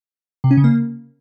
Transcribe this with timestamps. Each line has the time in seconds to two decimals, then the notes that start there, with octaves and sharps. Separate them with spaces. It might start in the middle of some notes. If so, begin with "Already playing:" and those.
0.44 C3
0.51 C#4
0.57 C#3
0.64 A#3